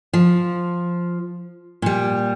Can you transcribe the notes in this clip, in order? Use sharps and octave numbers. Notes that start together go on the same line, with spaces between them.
F3
A#2 G3